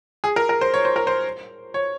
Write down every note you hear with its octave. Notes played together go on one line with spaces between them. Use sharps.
G#4
A#4
A#4
C5
C#5
C5
A#4
C5
C#5